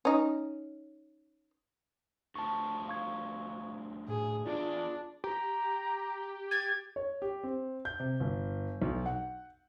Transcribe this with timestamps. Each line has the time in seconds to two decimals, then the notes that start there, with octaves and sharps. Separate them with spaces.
0.05 C#4 D#4
2.36 D2 F3 A5 C#6
2.88 F5 C#6 G#6
4.08 A2 G#4
4.46 E2 D4 F4 D5
5.24 G4 A#5
6.51 G#6 A6
6.96 C#5
7.22 G4
7.43 C4
7.85 G6
8.00 C3
8.20 G1
8.82 B1
9.06 F#5